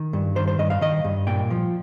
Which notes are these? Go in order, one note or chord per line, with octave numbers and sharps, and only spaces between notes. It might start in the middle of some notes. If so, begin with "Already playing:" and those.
Already playing: D#3
G2
D#3 C5
C5
G2 D#5
F5
D#3 D#5
G2
A#2 G5
F3